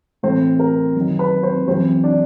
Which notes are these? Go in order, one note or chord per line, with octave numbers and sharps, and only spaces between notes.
A2 E3 C4 C5
A#4
F#2
D#3
B4
C4 C5
F#2 C#3 E3 C4 C5
D4 D5